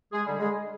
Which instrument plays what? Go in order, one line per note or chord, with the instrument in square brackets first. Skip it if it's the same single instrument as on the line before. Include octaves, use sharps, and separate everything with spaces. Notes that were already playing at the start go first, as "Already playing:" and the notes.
[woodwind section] G#3 G#4
D3 G3
G#3 G#4